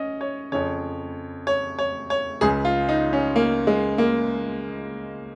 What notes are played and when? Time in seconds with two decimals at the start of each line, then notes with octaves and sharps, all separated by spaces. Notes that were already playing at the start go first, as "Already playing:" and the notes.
Already playing: C#4 D#5
0.21 C#5
0.52 F2 C#3 C#5
1.47 C#5
1.79 C#5
2.10 C#5
2.41 C#2 C#3 G#4
2.65 F4
2.89 D#4
3.13 C#4
3.36 A#3
3.67 G#3
3.98 A#3